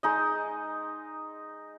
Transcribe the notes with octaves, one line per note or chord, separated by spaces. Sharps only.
G#3 D#4 D#5